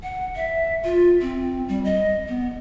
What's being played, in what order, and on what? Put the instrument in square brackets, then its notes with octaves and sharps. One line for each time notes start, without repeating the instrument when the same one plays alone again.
[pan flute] F#5
E5
F4
C4
G3
D#5
B3